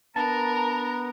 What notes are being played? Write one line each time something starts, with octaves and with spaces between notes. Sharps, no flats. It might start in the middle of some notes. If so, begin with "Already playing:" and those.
B3 D4 A#4 A5 A#5